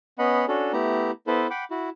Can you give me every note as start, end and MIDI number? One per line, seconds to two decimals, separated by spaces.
0.19 0.46 59
0.19 0.46 61
0.19 0.46 75
0.19 0.46 78
0.19 0.46 83
0.48 0.72 61
0.48 0.72 62
0.48 0.72 66
0.48 0.72 69
0.73 1.11 57
0.73 1.11 59
0.73 1.11 64
0.73 1.11 67
0.73 1.11 82
1.27 1.47 59
1.27 1.47 64
1.27 1.47 69
1.27 1.47 71
1.27 1.47 72
1.50 1.64 78
1.50 1.64 79
1.50 1.64 83
1.50 1.64 86
1.71 1.89 64
1.71 1.89 66